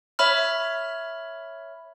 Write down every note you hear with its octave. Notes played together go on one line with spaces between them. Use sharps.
C#5 E5 B5 F6